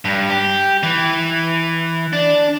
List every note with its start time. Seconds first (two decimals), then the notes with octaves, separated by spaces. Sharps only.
0.05 G2
0.30 G4
0.83 E3
2.13 D4